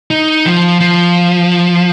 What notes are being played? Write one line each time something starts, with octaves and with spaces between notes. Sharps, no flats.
D#4
F3
F3